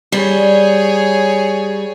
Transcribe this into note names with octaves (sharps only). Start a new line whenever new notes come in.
G3 G#4 C#5